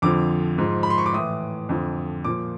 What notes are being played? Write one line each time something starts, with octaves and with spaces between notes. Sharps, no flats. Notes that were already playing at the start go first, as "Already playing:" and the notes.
F2 D3 F3 D6
G#2 F3
B5
C6
C#6
D6
A2 E3 D#6
F2 D3 F3
A#2 F3 D6